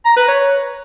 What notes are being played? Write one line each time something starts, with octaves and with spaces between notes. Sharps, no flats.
A#5
B4
C#5